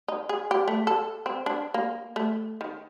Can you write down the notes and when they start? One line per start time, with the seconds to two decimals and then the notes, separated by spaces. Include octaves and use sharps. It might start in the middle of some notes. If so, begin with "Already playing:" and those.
0.08 D#4
0.29 G#4
0.51 G4
0.68 A3
0.87 A4
1.26 C4
1.46 D4
1.74 A#3
2.16 A3
2.61 D#3